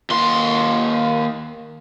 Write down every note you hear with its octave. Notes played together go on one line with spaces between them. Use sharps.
D#2 C6